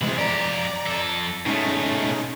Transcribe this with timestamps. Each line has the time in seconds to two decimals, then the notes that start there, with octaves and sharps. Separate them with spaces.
0.01 C3 E3 G#3 C4 B5
0.18 F2 G4 D5 A#5
0.86 F2 A4
1.46 B2 G#3 A3 C#4 D#4